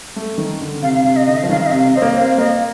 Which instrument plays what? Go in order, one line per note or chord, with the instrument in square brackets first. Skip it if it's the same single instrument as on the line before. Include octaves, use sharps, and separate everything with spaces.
[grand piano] A3
D#3
D3
[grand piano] C3 [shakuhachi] F5
[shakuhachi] F5
[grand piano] C3 [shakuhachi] F5
[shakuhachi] D#5
[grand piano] D3 [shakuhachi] D#5
[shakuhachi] F5
[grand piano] F3
[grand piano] D#3 [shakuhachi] F5
[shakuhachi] F5
D#5
[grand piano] C3 [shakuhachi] F5
[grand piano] C4 [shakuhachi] D#5
[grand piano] A#3
[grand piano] C4 [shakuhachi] F5
[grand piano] A#3 [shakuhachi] D#5